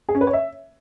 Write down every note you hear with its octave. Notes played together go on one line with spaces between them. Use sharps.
G#4
C#4
B4
C#5
E5